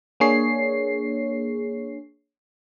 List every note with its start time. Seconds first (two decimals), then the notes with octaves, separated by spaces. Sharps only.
0.20 A#3 D4 G#4 C#5 C7